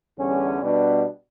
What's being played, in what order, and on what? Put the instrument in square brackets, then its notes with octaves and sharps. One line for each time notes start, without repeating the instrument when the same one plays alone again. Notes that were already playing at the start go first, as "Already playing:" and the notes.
[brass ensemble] E2 D3 G3 C#4
B2 G3 B3 D4